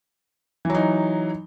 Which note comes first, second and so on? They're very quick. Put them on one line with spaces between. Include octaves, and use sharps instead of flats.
E3 F#3 D#4